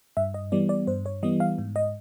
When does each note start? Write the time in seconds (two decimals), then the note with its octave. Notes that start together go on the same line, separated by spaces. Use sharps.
0.17 G2 E5
0.34 D#5
0.52 E3 G3 B3 D5
0.69 D5
0.87 G2 C5
1.06 C#5
1.23 E3 G3 B3 D#5
1.40 F5
1.58 G#2
1.76 D#5